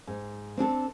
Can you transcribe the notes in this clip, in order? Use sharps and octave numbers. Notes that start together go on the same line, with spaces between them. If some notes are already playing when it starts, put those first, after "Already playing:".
G#2
C4 D4 G#4 A4